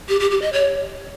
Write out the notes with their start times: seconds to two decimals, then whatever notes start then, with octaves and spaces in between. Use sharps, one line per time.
0.09 G4
0.20 G4
0.31 G4
0.42 D#5
0.53 C#5